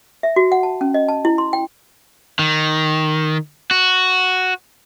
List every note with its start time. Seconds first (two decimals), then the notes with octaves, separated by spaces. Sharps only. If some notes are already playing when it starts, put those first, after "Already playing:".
0.23 E5
0.36 F#4
0.52 F#5
0.63 A5
0.81 C#4
0.94 D#5
1.08 A5
1.25 E4
1.38 C6
1.53 G5
2.39 D#3
3.71 F#4